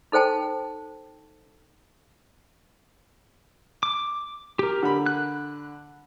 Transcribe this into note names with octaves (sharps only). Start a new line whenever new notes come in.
D#4 A4 C5 G5 A5
D6
G4 A#4
D3 B5
F#6